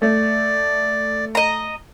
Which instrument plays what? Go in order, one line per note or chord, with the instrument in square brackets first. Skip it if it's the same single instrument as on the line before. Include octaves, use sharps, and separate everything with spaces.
[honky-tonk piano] A3 [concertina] D5
[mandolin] D#5 A#5